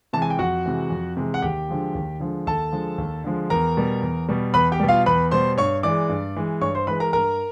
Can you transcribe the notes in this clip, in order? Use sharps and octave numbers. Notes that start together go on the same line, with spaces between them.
C3 E3 G#3 A5
G#5
G5
F2 F#4 F#5
C3 E3 G#3
F2
C3 E3 G#3
F#5
D#2 G4 G5
D3 F3 G#3
D#2
D3 F3 G#3
D#2 A4 A5
D3 F3 G#3
D#2
D3 F3 G#3
E2 A#4 A#5
B2 G3
E2
B2 G3
E2 B4 B5
G4 G5
B2 G3
F4 F5
E2 B4 B5
B2 G3 C5 C6
G2 C#5 C#6
E3 G#3 D5 D6
G2
E3 G#3
G2 C#5 C#6
C5 C6
E3 G#3 B4 B5
A#4 A#5
G2 A#4 A#5